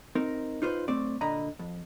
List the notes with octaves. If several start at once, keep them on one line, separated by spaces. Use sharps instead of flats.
C4 D#4 A#4
D#4 F4 B4 C5
B1 A3 C4 D5
A#2 D3 D#5 A#5 B5
F2